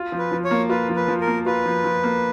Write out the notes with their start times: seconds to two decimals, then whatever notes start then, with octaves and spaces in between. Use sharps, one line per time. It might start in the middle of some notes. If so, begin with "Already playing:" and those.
Already playing: F4
0.12 F3
0.19 B4
0.32 F3
0.45 C#5
0.51 A#3
0.70 F4 B4
0.89 F3
0.96 B4
1.08 F3
1.21 A#4
1.27 A#3
1.46 F4 B4
1.66 F3
1.84 F3
2.03 A#3